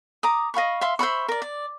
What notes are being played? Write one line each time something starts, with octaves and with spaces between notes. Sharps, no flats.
A#5 D6 D#6
D#5 F5 B5 C#6
E5 F5 C6
C5 E5 B5 C#6
A#4 D5
D5